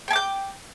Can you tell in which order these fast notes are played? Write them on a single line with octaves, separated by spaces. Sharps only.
G5 G#5 D6 G6